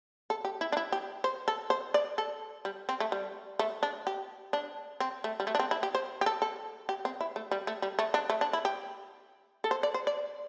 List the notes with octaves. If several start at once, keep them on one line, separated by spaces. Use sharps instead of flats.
A4
G4
E4
D4
E4
G4
C5
A4
C5
D5
A4
G3
C4
A3
G3
A3
D4
G4
D4
C4
A3
G3
A3
D4
C4
E4
G4
C5
G4
A4
A4
G4
C4
E4
A3
G3
A3
G3
A3
D4
A3
D4
E4
G4
A4
C5
D5
C5
D5